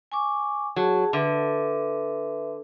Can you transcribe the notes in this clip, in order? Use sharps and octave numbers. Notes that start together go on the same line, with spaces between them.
G#5 C#6 D6
F#3 G#4 A5
D3 B4 E5